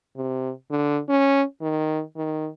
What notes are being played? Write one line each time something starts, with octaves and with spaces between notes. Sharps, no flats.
C3
D3
C#4
D#3
D#3